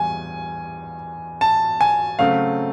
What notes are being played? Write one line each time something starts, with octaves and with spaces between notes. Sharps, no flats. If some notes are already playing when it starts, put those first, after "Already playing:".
Already playing: E2 G3 G#5
A5
G#5
C#3 F#3 A3 C4 F5